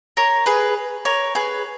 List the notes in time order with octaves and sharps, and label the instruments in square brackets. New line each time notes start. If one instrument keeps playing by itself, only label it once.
[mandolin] A#4 C#5
G#4 B4
A#4 C#5
G#4 B4